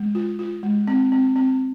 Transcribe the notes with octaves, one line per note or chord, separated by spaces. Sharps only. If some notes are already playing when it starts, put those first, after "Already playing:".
Already playing: G#3
F4
F4
G#3
C4
C4
C4